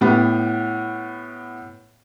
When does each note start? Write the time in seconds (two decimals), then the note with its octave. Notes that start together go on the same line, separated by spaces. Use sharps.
0.01 A2 B3 G4